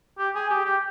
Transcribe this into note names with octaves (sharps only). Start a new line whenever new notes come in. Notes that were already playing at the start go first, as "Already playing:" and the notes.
G4
G#4
G4
G4